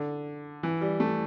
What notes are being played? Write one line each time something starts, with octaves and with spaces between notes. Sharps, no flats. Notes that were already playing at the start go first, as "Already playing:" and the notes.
Already playing: D3
E3
G3
A3